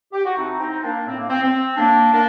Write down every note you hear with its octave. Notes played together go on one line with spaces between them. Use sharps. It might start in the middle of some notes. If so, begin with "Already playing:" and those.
G4
F#4
A2 C4 D#4
F#4
C4 D#4
A#3 D4
A2 C4
A#3
C4
C4
A2 A#3 D4
A#3 D4